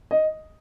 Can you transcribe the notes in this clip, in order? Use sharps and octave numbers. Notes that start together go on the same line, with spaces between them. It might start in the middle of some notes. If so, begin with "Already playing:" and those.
D#5